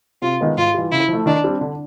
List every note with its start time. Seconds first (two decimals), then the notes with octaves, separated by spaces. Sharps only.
0.22 C3 F4
0.40 D#3 G#3 B3 D#4
0.57 G#2 F4
0.74 E3 G3
0.92 C#3 E4
1.08 F3 A3
1.26 D#3 D4
1.44 G3 C4
1.61 D3